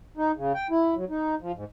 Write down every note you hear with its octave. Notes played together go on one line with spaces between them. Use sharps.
D#4
C#3
G5
E4
F#3
D#4
F3
G#2